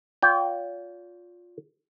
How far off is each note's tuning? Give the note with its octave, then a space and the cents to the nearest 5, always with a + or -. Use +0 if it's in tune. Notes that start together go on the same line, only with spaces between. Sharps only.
F4 +15 D5 -45 G5 +0